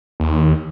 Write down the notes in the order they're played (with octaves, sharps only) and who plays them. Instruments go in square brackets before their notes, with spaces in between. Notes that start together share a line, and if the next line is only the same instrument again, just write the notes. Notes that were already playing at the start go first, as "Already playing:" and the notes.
[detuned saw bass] D#2